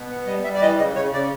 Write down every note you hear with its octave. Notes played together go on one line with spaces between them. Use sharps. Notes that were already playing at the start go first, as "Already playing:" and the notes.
Already playing: B2
B3
G3 D#5
G3 E5
D5
E3 D#5
C#3 D#5
C#3 C#5
C#3 D5